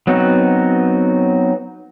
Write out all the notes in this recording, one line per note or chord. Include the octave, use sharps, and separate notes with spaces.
F#3 B3 C4 D#4 F#4